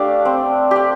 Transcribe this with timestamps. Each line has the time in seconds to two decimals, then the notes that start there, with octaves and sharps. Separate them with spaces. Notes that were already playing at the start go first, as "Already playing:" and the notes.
Already playing: A3 D4 G4 F5
0.25 C4
0.71 G4 D5